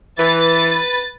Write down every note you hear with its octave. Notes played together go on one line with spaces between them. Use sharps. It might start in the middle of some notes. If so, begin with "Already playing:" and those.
E3 B4 A6